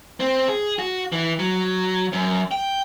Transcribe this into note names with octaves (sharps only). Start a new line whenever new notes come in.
C4
G#4
F#4
E3
F#3
F#2
G5